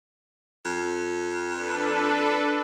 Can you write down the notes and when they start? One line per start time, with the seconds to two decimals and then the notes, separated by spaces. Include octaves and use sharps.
0.65 F2
1.51 D4 A4 B4